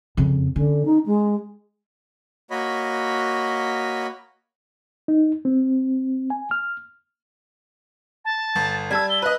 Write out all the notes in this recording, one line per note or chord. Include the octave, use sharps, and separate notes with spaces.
F2 C#3
D3 C#4
D#4
G#3
A#3 F#4 C#5 D#5 B5
D#4
C4
G#5
F6
A5
G1
G3 A5 E6 G#6
G7
B4 D#5 F#6